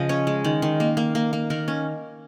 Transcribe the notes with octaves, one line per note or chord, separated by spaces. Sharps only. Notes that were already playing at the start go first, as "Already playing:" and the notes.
Already playing: C#3 F3 G#4 D#5
C#4 C#5
G#3
D#3
D#3
A#3
A#3
A#3
A#3
D#3 A#4
C#4